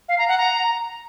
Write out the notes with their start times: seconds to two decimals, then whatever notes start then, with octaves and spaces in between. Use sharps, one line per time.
0.09 F5
0.18 A#5
0.28 F#5
0.38 A#5